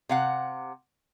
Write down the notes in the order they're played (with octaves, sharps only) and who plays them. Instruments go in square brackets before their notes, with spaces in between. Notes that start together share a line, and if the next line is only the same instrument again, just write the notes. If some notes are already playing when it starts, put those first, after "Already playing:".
[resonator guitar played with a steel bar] C3 F5 F#5